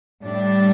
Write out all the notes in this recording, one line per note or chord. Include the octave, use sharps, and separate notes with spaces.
A2 G3 D4